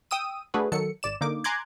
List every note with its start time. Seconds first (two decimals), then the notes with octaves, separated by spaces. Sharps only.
0.11 G5 D#6 E6 D#7
0.54 A3 D4 F#4 G#4 B4
0.72 D#3 F#3 A4 C#7
1.03 G#1 D5 E7
1.21 D3 A#3 D#4 D6
1.44 G#5 A#5 C6 D6 F#6 G#6